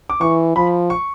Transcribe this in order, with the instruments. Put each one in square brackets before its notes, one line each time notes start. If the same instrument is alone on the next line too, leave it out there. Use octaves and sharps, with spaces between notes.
[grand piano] D6
[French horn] E3 [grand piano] C#6
[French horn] F3 [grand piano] B5
[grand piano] C#6